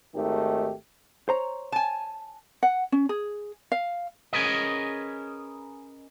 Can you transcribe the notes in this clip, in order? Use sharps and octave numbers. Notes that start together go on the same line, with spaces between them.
G#1 D#3 A3 G4
C5 C#5 A#5
G#5 A5
F#5
C#4
G#4
F5
C#4 G#4 A#4 B4 D#5